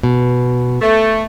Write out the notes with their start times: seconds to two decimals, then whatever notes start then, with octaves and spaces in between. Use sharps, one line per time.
0.03 B2
0.82 A3